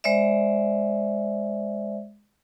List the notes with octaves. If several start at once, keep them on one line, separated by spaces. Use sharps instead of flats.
G#3 C5 D5 E5